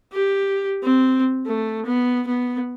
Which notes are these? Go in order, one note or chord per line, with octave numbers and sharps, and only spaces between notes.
G4
C4
A3
B3
B3